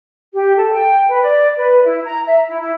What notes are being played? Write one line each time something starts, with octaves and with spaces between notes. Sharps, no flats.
G4
A4
G5
B4
D5
B4
E4
A#5
E5
E4
E4